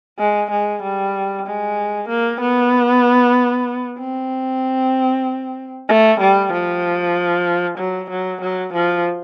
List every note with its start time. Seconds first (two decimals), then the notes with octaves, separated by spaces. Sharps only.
0.19 G#3
0.51 G#3
0.83 G3
1.47 G#3
2.09 A#3
2.41 B3
3.99 C4
5.89 A3
6.20 G3
6.53 F3
7.78 F#3
8.10 F#3
8.42 F#3
8.73 F3